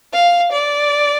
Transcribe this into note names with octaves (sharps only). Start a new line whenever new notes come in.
F5
D5